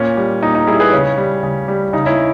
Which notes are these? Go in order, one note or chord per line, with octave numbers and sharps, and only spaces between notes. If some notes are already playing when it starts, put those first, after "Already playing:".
Already playing: A#2 C#4
G3
A#2 D#4
D#4
G3 E4 G#4
G#4 B4
C#3 C#4
G3
C#3
G3
C#3 D#4
C#4 E4